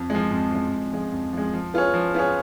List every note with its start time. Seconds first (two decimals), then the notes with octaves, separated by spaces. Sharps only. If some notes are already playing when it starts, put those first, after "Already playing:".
Already playing: F2
0.10 F3 G#3
0.31 F2
0.51 F3 G#3
0.72 F2
0.92 F3 G#3
1.12 F2
1.33 F3 G#3
1.54 F3
1.74 B3 F4 G#4 C#5
1.94 F3
2.14 B3 F4 G#4 C#5